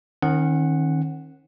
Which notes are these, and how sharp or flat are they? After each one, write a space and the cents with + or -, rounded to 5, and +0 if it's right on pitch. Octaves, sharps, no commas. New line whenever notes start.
D#3 +0 C#4 -45 F#5 +0